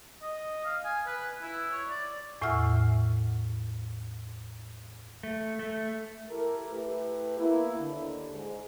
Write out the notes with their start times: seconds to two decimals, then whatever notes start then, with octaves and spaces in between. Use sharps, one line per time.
0.22 D#5
0.65 F5
0.85 G#5
1.06 B4
1.42 E4
1.71 C#5
1.88 D5
2.41 E2 A2 E5 F#5 E6 F6
5.23 A3
5.59 A3
6.29 E4 G4 A4 A#4
6.71 A3 E4 G4 B4
7.37 A#3 B3 E4
7.78 D#2 D3
8.31 G#2